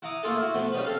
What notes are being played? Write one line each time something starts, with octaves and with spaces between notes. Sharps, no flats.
E4 F#5 A#5 D6 D#6
A3 A#3 E4 F4 G#4 A4
E4 F#4
F3 A3 B3
C#3 G3 D#4 B4
C4 A4 F5